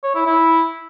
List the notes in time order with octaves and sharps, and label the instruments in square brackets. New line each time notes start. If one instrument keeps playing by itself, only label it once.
[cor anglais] C#5
E4
E4